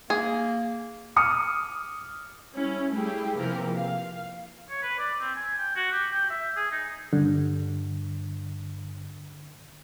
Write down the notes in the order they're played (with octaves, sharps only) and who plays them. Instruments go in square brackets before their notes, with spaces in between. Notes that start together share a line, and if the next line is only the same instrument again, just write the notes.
[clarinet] A#3 [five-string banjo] G#4
[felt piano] D6 D#6 F6 C#7
[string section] G3 C#4 E4
G3 A3 E4 G4 G#4
C3 E3 F3 A#3 G4 A#4
F5
[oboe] C#5
B4
D5
C4
G#5
G5
F#4
G4
G5
E5
G#4
D#4
[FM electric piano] G2 [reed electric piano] D3